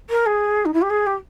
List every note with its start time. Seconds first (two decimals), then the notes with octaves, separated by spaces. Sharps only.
0.10 A#4
0.26 G#4
0.65 D#4
0.74 E4
0.82 G4
0.90 G#4
1.06 G4